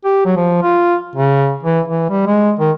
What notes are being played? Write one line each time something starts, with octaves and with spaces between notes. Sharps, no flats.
G4
F#3
F3
F4
C#3
E3
E3
G3
G#3
D#3